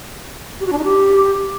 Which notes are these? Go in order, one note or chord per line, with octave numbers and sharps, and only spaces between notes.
G4
F#4
D4
D#4
G4